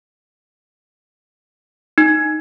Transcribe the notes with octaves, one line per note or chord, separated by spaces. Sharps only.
D#4